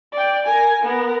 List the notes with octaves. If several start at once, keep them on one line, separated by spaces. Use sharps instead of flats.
D5 G5
A#4 G#5
B3 A#4